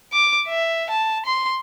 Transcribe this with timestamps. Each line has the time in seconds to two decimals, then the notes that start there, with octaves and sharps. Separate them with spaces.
0.13 D6
0.48 E5
0.90 A5
1.26 C6